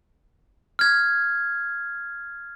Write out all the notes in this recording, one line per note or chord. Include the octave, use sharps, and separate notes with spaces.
F6 G#6